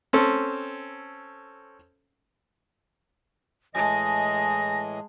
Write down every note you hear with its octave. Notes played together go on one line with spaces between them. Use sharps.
C4 C#4 A4
A2 E3 G#3 D#5 G#5 A5 A#6